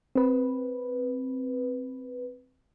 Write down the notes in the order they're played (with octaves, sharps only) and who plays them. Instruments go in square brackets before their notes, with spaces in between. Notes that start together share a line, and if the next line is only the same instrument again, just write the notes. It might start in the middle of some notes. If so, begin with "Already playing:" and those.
[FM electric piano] C4 B4